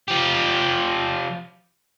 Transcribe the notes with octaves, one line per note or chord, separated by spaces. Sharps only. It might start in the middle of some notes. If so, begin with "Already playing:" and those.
F3 G4